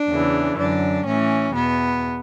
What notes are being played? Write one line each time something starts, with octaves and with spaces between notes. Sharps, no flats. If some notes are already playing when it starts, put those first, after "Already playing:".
Already playing: D4
E2 C#3 E3
F#2 D3 D4
A2 E3 C#4
E2 B2 B3